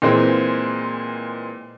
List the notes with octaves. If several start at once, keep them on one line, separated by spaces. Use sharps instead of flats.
A#2 E3 G#3 A#3 C4